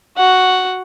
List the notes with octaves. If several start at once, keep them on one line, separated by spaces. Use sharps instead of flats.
F#4 F#5